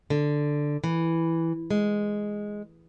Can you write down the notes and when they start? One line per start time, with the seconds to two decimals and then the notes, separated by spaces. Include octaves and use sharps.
0.10 D3
0.84 E3
1.70 G#3